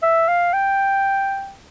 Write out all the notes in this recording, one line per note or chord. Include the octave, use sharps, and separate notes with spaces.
E5
F5
G5